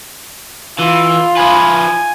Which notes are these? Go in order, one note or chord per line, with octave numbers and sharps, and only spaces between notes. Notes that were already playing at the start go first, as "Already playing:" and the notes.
E3 F4
F3 B4 G#5